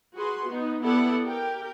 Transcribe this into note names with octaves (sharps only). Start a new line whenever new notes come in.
F#4 G#4 B4 C6
B3 D#4
B3 E4 G4 A4 D5 F#5
G4 A#4 G5